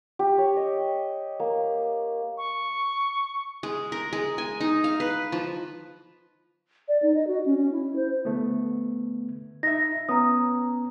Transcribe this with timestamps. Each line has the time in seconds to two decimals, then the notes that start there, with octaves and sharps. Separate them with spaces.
0.19 G4
0.38 C#5
0.57 D#5
1.40 A#3
2.38 C#6
3.63 G#3
3.92 A#4
4.13 G#3
4.38 G#5
4.61 D#4
4.84 F5
5.00 B4
5.32 F3
6.88 D5
7.02 D#4
7.14 D#5
7.27 F#4
7.46 C#4
7.57 C#4
7.71 E4
7.96 C5
8.25 D3 A3 B3
9.63 D#4 E5 A#6
10.09 B3 C#4 A#5 D#6